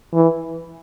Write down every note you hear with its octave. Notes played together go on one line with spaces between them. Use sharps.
E3